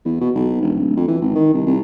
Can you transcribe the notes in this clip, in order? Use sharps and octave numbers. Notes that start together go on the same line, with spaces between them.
E2
B2
B1
E1
D1
F2
E3
G#1
D#3
C2
C2